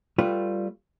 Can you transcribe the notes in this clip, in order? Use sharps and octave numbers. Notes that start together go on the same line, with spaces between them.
G3 A3 F4 B4